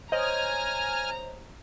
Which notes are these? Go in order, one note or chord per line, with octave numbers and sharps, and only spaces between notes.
C5 C#5 D#5 G#5 A#5 F6